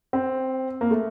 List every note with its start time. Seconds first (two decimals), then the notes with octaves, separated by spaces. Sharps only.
0.13 C4
0.81 A#3
0.91 A3